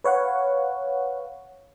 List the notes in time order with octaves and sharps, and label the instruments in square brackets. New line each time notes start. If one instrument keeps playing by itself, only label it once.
[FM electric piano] B4 C#5 F5 F#5